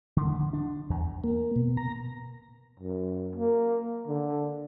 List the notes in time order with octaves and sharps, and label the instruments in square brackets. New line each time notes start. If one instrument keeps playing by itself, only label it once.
[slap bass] D3
D3
D4
E2
[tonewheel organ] A#3
B2
A#5
[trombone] F#2
A#3
D3